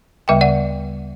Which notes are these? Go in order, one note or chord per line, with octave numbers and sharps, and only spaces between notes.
D2 C#3 G3 E5 G5
D5 F#5